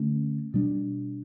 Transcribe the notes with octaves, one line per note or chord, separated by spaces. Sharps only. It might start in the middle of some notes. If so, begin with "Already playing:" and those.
Already playing: D3 A3 C#4
B2 G3 D4